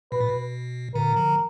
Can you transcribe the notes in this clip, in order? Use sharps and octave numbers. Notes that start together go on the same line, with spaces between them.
B2 B4
A#2
B2
A#2 D3 A#4
D3 F3